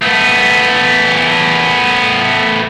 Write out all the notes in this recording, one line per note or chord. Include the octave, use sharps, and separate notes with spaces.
A3 B3